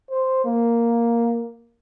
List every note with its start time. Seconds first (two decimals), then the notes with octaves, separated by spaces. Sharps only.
0.10 C5
0.45 A#3